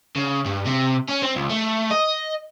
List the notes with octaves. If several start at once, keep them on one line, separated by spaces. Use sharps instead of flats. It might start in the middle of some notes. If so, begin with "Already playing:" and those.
C#3
G2
C3
C#4
C4
C#2
A3
D#5